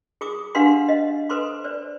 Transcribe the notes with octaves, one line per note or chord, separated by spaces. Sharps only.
G#4 D6 D#6
D4 G4 B4 F5 F#5 C6
D#5 F5
A4 B4 C5 C6 D6
B4 C5 D5